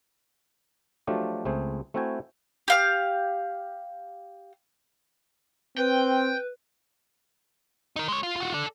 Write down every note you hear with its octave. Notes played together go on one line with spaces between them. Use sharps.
F3 F#3 A3 D4 F4 G4
C#2 A3 C4 G#4 C5
A3 C4 E4 F#4 G5 G#5
G4 F5 F6
C4 B4 G5
D#4 A#4
G#3 C#5
F4
F4 F#4
A4 D5